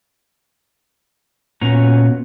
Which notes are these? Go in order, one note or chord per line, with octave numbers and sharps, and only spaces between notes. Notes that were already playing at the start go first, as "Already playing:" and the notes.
A#2 B3 C#4 F#4 A#5